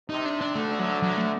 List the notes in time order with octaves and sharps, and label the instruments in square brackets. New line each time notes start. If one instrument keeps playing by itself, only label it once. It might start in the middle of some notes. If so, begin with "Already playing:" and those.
[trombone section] C3 [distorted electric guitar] D#4
[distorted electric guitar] D4
D4
[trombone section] D2 D3 [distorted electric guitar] A3
[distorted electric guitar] F#3
F#3
A3